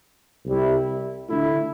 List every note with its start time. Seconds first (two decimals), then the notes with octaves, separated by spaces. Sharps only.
0.45 C2 C3 G3 E4
1.29 D3 A3 E4